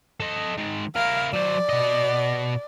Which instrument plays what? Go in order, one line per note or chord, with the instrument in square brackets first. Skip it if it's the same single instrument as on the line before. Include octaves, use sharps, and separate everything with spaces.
[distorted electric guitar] A4 D#5
D#3 G#3
[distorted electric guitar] E4 A#4 [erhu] F5
[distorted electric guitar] F#3 C5 [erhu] D5
[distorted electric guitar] B2 D#5